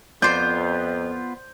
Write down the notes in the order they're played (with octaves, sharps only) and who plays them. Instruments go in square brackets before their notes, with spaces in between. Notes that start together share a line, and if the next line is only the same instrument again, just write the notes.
[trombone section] F2 [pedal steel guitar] B3 F4 [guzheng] C5 D5 [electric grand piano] G6